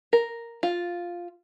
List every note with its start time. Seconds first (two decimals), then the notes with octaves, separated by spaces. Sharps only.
0.13 A#4
0.63 F4